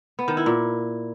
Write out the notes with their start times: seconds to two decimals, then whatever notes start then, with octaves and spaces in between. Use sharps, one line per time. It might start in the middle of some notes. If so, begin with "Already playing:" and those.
0.19 B3
0.28 D#3
0.37 E4
0.46 A#2